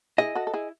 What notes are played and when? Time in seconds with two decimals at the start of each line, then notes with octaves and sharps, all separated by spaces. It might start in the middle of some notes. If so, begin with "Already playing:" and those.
0.18 E4 G#4 D#5
0.35 F#4 A4
0.47 A4
0.53 E4 G#4